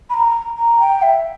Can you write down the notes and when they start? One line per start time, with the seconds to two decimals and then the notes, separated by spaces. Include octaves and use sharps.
0.09 B5
0.13 A#5
0.57 A#5
0.79 G5
1.02 E5